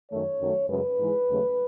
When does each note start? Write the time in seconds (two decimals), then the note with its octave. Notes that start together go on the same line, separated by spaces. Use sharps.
0.11 F#2 D#3 A3 C#5
0.40 F#2 D#3 F#3 A3
0.69 F#2 C#3 G#3 B4
0.98 G#2 E3 G#3
1.28 D#2 C#3 F#3 A3